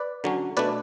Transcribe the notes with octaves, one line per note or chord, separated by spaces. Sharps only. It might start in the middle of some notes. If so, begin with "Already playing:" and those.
Already playing: B4 D5
D3 F#3 C#4
B2 A3 D4 B4 D5